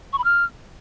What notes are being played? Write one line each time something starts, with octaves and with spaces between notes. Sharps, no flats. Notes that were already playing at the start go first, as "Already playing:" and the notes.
C#6
B5
F6